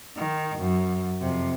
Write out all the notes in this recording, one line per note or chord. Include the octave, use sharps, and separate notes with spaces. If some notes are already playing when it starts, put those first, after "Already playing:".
D#3
F#2
F2 C3